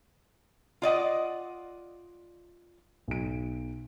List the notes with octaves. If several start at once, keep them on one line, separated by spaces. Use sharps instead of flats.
F4 D5 D#5 F#5
B1 D7